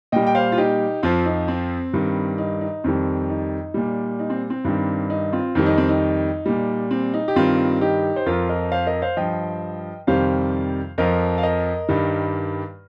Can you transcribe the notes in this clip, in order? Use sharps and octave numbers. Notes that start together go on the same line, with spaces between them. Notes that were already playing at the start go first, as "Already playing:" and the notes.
A#2 G3 D#5 G5
G5
C5 F5
F4
D#4 G4
F2 F3 C4 F4
D#4
C4
G2 D#3 G3
D#4
D#4
F2 D#3 G3 C4
D#4
A#2 G3
D#4
C4
C4
G2 D#3 G3
D#4
C4 F4
F2 D#3 G3 C4
D#4
C4
D#4
A#2 G3
C4
D#4
G4
G2 D#3 G3 C4 F4
D#4 G4
C5
F2 F3 F4 A#4
A#4 D#5
C5 F5
A#4 D#5
C5 F5
G2 F3 D#5 G5
F2 C3 D#3 G3 C5 F5
F2 F3 A#4 D#5
F5
A#4 D#5
G2 D#3 G3